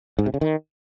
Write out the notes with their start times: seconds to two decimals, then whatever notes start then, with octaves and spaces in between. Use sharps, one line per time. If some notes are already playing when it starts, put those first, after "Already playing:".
0.19 G#2
0.26 C3
0.34 C#3
0.41 D#3